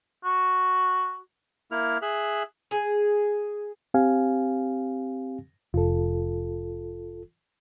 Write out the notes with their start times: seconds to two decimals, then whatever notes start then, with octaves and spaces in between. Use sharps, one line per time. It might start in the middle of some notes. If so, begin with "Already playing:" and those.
0.24 F#4
1.71 A#3 E4 F6
2.02 G#4 E5 F#6
2.71 G#4
3.94 C4 G4 F5 G#5
5.74 F1 F4 A4